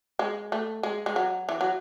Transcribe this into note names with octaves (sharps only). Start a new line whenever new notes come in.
G#3
A3
G#3
G#3
F#3
E3
F#3